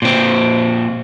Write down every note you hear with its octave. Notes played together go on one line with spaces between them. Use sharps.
A#2 C4